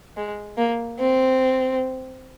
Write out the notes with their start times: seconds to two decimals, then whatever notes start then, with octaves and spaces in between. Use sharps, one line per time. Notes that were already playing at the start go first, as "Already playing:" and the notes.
0.17 G#3
0.58 A#3
1.00 C4